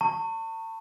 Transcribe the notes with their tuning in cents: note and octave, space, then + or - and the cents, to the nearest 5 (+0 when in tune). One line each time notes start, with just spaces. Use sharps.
A5 +40 C#6 -15